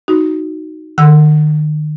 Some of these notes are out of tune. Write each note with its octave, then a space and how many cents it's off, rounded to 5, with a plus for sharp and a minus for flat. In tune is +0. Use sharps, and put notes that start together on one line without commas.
D#4 +5 F#4 +0
D#3 -35 F#5 +0 E6 +0